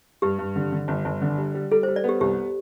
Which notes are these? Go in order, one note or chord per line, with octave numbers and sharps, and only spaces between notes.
G2 G4
G2
D3
D3
G1
G1
D3
G3
G3
G3 A4
G3 C5
D5
B3 G4
C2 G4